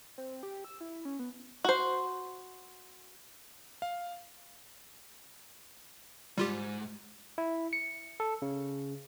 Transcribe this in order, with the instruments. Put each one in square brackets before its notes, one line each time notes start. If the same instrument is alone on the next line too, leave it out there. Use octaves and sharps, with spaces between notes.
[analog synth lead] C4
G4
E6
E4
C#4
B3
[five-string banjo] F#4 C5
[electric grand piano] F5
[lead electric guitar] D2 G#2 [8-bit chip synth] G3 F4 G4
[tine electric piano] E4
C#7
A4
C#3